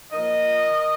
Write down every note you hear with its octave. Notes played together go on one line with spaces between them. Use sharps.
A#2 F3 A#4 D#5